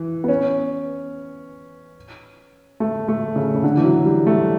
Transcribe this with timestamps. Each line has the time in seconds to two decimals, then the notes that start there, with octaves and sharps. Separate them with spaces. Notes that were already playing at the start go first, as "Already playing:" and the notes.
Already playing: E3
0.24 B3
0.28 C#4
2.80 A3
3.08 A3
3.36 C#3
3.54 C#3
3.64 D3
3.77 E3
3.84 F#3
4.05 G3
4.27 A3